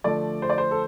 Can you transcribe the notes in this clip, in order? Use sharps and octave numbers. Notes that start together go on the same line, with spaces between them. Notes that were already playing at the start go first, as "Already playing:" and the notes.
D3 F3 A3 D5
C5
D5
C5
A4